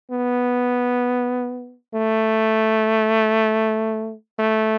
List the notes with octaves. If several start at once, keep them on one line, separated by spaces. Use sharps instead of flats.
B3
A3
A3